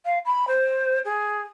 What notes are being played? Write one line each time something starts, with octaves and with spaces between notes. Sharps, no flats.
F5
B5
C5
G#4